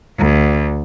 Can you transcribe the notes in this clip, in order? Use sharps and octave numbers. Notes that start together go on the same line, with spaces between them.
D2